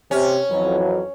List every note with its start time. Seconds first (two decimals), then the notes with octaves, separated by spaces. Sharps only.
0.11 C3 C#4
0.50 F2 E3 F#3